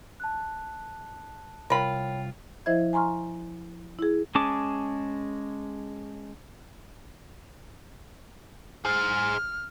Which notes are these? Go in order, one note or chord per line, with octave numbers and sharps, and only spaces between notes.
A5 F#6
C2 F4 A#4 C#5 G5 B5
F3 E4 C5 D#5 E5 G#6
G#5 A#5 C6 C#6 F6
E4 G#4
G#3 C#4 G#4 A5 D6
G#4 C5 F6